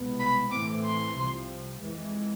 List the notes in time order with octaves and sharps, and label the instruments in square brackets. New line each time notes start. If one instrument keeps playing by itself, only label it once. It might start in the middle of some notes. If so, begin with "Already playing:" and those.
Already playing: [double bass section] C2 B2 G#3 B3
[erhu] B5
[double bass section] A2 E3 A3 C4 [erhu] D6
[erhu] C6
[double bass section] C2 C3 F3
F2 E3 G#3